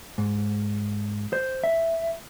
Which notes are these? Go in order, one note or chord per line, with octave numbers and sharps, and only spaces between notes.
G#2
C5
E5